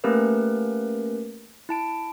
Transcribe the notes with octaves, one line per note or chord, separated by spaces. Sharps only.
A3 A#3 C#4 G4 A#4 B4
E4 A5 D7